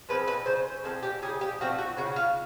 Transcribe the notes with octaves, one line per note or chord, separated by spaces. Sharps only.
F3 G#3 C4 B4
B4
C#3 C5
F3 G#3 C4 A4
G4
C#3 G#4
G4
F3 A3 C4 F#4
F#4
C#3 F#4
F4